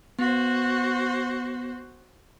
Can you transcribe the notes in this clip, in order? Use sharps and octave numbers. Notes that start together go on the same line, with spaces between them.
B3 F#4 C5